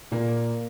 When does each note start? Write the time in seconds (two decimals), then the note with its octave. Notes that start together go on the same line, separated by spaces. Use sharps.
0.12 A#2 A#3